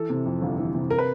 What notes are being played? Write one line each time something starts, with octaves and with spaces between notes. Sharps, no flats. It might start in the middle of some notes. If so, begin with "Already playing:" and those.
Already playing: E3 A4
C3
F2
G1
E3
C3
A#4
B4